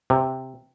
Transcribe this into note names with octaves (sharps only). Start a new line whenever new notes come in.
C3